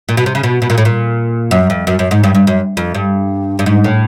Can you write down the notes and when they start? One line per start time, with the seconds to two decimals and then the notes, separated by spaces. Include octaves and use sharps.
0.09 A#2
0.17 B2
0.26 C3
0.35 C#3
0.43 B2
0.62 B2
0.70 A#2
0.78 A2
0.85 A#2
1.51 F#2
1.70 F2
1.87 F#2
1.99 F#2
2.11 G#2
2.24 G2
2.35 G2
2.47 F#2
2.77 F2
2.95 G2
3.59 G2
3.66 G#2
3.84 A2